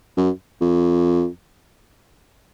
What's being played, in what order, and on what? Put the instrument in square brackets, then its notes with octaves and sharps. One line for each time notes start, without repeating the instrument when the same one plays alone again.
[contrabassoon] F#2
F2